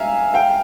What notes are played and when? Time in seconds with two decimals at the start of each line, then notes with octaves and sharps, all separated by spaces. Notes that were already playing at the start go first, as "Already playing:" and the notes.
Already playing: E5 F5 G#5 A#5
0.34 F5 G5